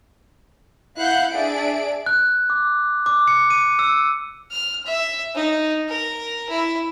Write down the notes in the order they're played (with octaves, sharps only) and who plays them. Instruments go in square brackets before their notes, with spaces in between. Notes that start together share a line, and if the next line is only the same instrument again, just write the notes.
[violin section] E4 F5 F#5 F#6 G6
D4 G#4 D5 E5 D7
[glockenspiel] F#6
D6
D6
C#7
D#7
E6
[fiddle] F6
E5
D#4
A#4
E4